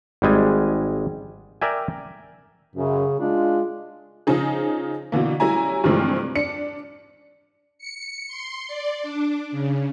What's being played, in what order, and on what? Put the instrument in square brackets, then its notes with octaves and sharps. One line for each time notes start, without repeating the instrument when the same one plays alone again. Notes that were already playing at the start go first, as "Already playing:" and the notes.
[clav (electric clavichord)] G#1 G3 G#3 G#5
A#4 D5 E5 G5 G#5
[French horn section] F#2 [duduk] C#3
[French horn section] G#3 F4 [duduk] D4
[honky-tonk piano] C#3 F3 D#4 G#4
B2 D3 E3 A#3
F#3 G3 C#4 E4 G#5 A#5
G2 C3 E3 F3 G#3 A3
D4 C#7
[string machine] C#7
C6
D5
D4
C#3